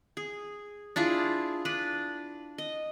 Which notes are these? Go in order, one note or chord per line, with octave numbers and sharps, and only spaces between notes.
G#4
D4 E4 F4 G#4
D4 B4
D#5